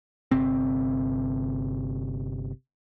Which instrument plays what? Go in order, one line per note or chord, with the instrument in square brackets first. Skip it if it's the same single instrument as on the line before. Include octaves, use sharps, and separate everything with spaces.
[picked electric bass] G1 C3 C4